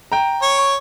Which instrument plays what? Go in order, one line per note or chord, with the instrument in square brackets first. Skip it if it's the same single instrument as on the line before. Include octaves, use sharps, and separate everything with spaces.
[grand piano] G5 A#5
[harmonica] C#5 C#6